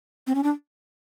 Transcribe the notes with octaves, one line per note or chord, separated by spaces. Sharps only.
C4
C#4
D4